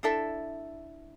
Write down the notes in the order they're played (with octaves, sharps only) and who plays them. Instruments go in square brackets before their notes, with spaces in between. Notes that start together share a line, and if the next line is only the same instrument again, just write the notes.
[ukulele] D4 E4 A4 E5